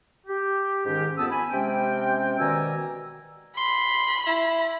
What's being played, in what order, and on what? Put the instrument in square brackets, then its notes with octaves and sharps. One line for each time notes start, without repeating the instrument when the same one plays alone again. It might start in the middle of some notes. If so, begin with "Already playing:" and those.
[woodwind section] G4
G#2 D#3 C#4 G4
F2 B3 A5 D#6 E6
G#5 B5
C3 G#3 C#4 G5
B2 D#3 D5 G#5 A#5 E6
[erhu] B5 [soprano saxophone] C6
[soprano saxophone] E4